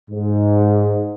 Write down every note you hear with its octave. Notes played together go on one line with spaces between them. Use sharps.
G#2